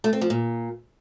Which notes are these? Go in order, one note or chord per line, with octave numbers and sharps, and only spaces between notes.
A3
C4
F3
A#2